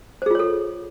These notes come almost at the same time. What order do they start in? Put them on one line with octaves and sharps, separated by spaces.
C5 G#4 F4 C#5 A4